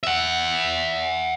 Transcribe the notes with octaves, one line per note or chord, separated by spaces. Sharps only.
E5 F#5